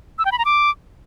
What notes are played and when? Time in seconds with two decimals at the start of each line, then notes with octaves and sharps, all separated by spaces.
0.19 E6
0.25 G5
0.32 B5
0.39 A#5
0.45 D6